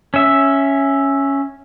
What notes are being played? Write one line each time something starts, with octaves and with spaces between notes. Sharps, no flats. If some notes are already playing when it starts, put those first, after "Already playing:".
C#4 E5